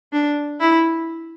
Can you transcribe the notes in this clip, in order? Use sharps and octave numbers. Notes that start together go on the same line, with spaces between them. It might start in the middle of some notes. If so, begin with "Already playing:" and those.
D4
E4